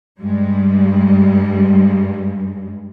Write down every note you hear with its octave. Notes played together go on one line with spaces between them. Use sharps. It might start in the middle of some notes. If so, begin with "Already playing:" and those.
G2 G3 G#3